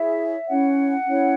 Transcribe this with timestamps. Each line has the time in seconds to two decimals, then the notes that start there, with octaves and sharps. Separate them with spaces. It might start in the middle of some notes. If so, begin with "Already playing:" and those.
Already playing: E4 G#4 C#5 E5
0.47 C#4 E4 C#5 F#5
1.06 C#4 E4 C#5